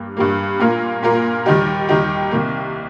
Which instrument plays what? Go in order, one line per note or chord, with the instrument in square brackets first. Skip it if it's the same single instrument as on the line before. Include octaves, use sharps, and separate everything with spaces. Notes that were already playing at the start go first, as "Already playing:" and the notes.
Already playing: [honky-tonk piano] G2 G3 A#3
G2 G3 A#3
A#2 A#3 F4 A#4
A#2 A#3 F4 A#4
D#2 D#3 G3 D#4 G4
D#2 D#3 G3 D#4 G4
C2 C3 D#3 A#3